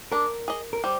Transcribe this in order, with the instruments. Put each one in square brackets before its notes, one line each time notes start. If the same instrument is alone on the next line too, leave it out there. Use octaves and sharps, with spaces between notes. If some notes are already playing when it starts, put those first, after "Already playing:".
[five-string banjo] D4 [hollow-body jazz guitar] A#4
[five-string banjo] G#4 D#5
[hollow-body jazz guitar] A#4
[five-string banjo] G3 [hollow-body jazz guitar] C5